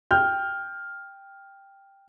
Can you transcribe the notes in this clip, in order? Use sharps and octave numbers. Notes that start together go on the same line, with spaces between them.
G5 F6 G6